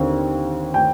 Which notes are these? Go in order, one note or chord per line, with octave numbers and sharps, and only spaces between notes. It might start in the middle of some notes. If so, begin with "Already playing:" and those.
Already playing: D#2 D3 C4
G5